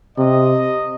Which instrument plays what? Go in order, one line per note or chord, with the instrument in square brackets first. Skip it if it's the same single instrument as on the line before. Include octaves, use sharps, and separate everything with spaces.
[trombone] C3 [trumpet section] D#5